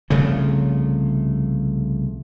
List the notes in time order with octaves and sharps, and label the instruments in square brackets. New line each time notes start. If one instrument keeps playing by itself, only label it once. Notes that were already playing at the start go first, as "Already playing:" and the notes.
[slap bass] C2 C#3 F3 A3